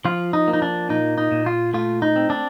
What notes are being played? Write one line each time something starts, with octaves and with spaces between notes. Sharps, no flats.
F3 F4
D#4
A#3
D#4
D4
A#2 D#4
D#4
A#2
F4
A3 F4
D#4
C4
D4